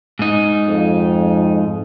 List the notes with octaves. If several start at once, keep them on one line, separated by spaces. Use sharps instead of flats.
G#2 D#4
F2